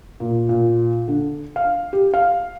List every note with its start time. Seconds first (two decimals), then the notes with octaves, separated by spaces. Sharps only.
0.20 A#2
0.49 A#2
1.08 D3
1.56 F5
1.93 G4
2.14 F5